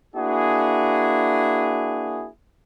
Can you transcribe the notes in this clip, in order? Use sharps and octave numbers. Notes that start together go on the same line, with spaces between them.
A#3 D4 E4 F#4 G#4